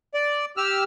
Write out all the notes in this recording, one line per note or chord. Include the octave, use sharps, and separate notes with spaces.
D5
G4 E6 F6